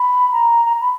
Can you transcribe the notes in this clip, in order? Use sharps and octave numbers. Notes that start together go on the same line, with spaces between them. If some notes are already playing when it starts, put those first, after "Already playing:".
Already playing: B5
A#5
A#5
B5